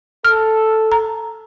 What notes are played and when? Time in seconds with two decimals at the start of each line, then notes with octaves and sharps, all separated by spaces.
0.25 A4 F6
0.92 A#5